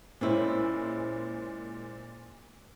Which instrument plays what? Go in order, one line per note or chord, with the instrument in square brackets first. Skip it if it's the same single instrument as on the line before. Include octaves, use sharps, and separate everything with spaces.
[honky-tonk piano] A#2 G#3 C5 [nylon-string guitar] C4 C#4 E4